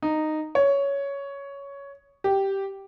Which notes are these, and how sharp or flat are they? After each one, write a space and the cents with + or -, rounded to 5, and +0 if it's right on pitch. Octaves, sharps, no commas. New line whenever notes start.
D#4 -10
C#5 +10
G4 -5